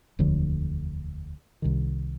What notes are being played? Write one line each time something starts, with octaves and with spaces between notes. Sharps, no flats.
E1 D2 D3 F3
C2 C3 D#3